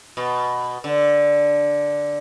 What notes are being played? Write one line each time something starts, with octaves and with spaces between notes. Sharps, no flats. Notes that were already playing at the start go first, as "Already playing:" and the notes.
B2
D3